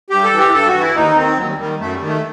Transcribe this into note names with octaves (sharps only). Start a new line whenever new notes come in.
G2 G4
A4
E3
G4
G2 A4
F#4
E3
E4
D#2 D#4
D#3 C4
D#2 F#3
G3
D#3 G3
F#2 A3
G3
D#3
A3